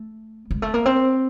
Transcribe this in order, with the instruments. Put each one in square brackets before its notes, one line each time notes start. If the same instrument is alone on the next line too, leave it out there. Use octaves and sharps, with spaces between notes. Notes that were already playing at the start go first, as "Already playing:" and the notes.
Already playing: [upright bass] A3
G#3
A3
A#3
C4